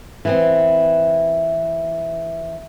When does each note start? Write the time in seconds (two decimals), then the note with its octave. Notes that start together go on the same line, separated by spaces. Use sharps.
0.25 E3 B3 C4